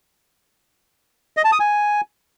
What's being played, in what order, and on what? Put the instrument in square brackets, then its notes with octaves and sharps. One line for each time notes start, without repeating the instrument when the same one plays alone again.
[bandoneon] D#5
A5
D#6
G#5